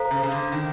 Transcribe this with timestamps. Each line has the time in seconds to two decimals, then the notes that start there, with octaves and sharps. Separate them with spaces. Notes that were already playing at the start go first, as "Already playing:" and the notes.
Already playing: A4 C5 F5 A#5
0.11 C#3
0.23 C#3
0.32 D3
0.52 D#3